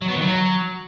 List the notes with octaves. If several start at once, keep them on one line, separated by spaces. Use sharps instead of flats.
F#3
B3
D#3
F#3